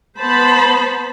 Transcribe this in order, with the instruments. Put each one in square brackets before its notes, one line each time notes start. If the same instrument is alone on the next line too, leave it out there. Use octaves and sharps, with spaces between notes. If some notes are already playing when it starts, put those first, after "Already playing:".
[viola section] B3 C5 A5 B5